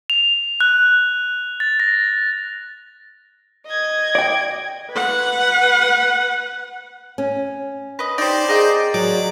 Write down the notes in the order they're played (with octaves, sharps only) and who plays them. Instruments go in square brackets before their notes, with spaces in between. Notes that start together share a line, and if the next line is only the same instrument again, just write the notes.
[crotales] F7
F#6
A6
A#6
[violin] D#5 G#6
[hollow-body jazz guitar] D5 G5
[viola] B4 F#5
[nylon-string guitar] C#4
[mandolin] B4 D#5
[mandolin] D#4 G4 [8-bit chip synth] C5 D5
[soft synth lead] G#4 [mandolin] A#4 D#5 G5
[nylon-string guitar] F#3 [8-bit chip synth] D5 D6